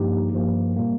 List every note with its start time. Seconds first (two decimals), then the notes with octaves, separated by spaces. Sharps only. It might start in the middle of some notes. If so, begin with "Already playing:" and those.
Already playing: G2 F3 A#3 D#4 G4
0.33 G2 F3 A#3
0.76 A#2 G3 A#3